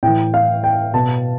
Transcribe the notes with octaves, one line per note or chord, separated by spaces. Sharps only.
A2 E3 G5
F5
G5
B2 A5